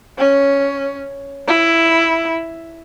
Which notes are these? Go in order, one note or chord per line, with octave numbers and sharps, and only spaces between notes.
C#4
E4